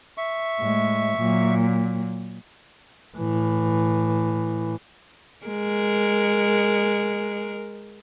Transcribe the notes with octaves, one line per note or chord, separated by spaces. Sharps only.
E5 C#6
A2 G#3
A#2 F#3
A2 E3
G#3 A#4